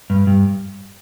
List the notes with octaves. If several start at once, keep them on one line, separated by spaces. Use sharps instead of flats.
G2
G2